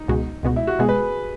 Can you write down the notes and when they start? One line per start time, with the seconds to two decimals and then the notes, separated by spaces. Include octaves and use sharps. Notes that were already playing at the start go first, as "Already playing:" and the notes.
Already playing: D#4
0.08 C#2 B2 G#3 B3 F#4
0.43 C#2 B2 G#3 B3 F#4
0.56 E4
0.67 F#4
0.79 B2 G#3 B3 F#4 G#4
0.89 B4